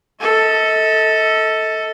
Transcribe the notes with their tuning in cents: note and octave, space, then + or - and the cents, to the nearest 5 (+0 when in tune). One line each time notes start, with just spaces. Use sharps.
A4 +5 D#5 +40